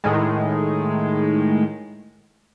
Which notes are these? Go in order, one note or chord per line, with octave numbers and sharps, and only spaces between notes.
A2 D#3 G#3